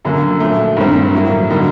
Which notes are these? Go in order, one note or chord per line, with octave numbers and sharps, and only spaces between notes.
F#2 D3 F#3 A#3
A#2 F3 A3
G2 D#3 G3 C4
A2 F#3 A#3
D3 G3 A#3 D#4